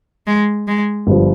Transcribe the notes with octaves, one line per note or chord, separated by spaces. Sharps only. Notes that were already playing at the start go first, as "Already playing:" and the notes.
G#3
G#3
G1 G2 F3